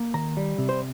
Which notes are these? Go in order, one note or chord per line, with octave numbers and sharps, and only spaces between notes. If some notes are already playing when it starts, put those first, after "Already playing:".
Already playing: A#3
D#3 A#5
G3
C3
C5